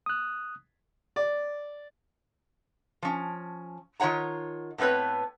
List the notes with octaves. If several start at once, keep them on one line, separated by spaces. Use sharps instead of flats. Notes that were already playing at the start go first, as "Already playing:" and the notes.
D#6 F#6
D5
F3 C#4
D#3 F4 C#5 F#5 A#5
A2 B3 C4 B4 C#5